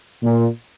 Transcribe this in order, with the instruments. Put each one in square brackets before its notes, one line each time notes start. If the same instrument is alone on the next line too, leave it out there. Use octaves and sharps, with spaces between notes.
[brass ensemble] A#2